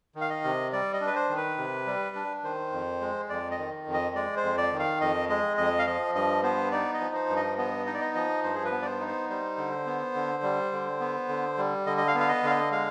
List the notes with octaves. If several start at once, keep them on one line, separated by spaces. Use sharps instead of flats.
D#3
F5
D#5
C3
G3 D5
D#5
D4
B4
C5
D#3
B4
C3
G3
D4
D#3 C5
F2
G#3
F2 D5
D#5
D#3
F2
D#5
G#3 D5
C5
F2
D5
D#3
F5
F2 D#5
G#3 D#5
F2 D#5
F5
F3 D#5
G2 D#5
B3 C5
D#4 D5
D#5
F3
C5
G2
D#5
B3 D#5
D#4 D#5
D5
D#5
F3 D#5
G2 C5
G#4
B4
B3
D5
C5
D#4
C5
G3 C5
D3
B3
D3
G3
D3
B3
D3
G3
D3 D#5
D#5
F5
B3
F5
D#5
D3 F5
D#5
G#3 F5